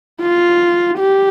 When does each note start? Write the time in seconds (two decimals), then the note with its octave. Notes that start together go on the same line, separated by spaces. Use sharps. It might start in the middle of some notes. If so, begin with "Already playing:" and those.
0.22 F4
0.99 G4